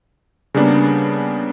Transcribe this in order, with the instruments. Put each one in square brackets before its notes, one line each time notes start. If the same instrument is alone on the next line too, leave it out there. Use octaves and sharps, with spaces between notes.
[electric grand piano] C#3 G3 A#3 B3 D4